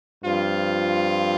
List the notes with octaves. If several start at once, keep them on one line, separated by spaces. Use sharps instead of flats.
G2 F3 C4 F4